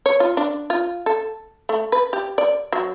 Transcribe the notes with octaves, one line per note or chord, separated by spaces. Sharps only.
C#5
F4
D4
F4
A4
A3
B4
G4
D5
F#3